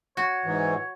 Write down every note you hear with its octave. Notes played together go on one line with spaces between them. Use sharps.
F#4 C#5
G#2 E3